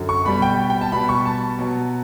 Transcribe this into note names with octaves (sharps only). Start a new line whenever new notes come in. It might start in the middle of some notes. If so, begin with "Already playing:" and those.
Already playing: F#2 D3 F#3
C#6
B2 G3 B5
G5
G5
A5
B2 G3 B5
C#6
A5
B2 F#3